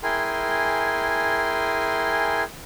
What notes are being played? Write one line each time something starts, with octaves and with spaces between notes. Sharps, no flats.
E4 G#4 A#4 G5 G#5 C6